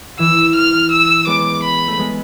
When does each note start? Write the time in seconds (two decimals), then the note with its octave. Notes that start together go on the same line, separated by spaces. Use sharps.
0.19 E3 E6
0.55 F6
0.91 E6
1.27 G#3 B3 D6
1.63 B5
1.88 A3
1.99 G#3 B3